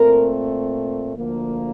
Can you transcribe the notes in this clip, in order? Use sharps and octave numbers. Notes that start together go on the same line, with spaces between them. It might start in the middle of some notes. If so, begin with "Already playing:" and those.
Already playing: A#2 A3 C4 A#4
D2 D3 F3 A#3